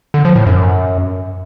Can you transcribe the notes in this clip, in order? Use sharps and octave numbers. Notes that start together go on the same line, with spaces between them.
D3
F3
A2
F#2